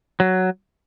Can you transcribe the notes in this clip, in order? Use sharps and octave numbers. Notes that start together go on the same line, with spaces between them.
F#3